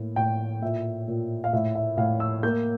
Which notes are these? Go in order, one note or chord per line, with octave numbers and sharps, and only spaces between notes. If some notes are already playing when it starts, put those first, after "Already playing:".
Already playing: A2 A#3
A2 G5
A#2 E5
A#2
F5
A2 E5
E5
A2 F5
E6
A#3 G6